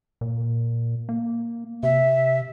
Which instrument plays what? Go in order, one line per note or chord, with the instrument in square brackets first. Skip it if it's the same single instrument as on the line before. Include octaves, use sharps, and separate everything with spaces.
[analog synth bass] A#2
A#3
[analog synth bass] C3 [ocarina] E5